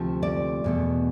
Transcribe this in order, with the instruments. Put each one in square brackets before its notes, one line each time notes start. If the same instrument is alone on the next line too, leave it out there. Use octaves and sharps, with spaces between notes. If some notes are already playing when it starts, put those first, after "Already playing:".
Already playing: [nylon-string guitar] D2 C3 F3 A3
D5
E2 B2 A3